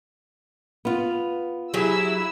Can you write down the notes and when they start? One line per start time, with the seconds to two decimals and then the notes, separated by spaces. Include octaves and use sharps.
0.85 B3 F4
1.74 F#3 E4 G4 G#4 E6